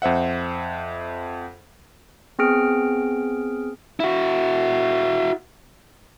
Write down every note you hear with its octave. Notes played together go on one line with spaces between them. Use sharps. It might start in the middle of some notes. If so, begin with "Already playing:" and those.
F2 C5 E5 F#5
B3 C4 G#4 F6 D7
E4 F#4